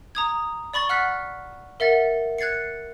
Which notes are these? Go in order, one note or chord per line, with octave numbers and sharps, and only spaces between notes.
A#5 D#6 G#6
D5 B5 C#6 A6 G7
F#5 F6 F#6 B6
A#4 E5 F#5 A6
F#6 G#6 A6 C7 C#7